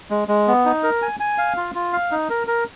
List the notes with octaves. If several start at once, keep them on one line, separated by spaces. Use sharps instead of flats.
G#3
G#3
B3
D#4
A#4
G#5
G#5
F5
F4
F4
F5
D#4
A#4
A#4